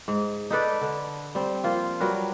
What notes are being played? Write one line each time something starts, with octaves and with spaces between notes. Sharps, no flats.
G#2
D#4 A4 B4 D5
D3
G3 C4
F3 A#3 F4
F#3 G3 A#4 B4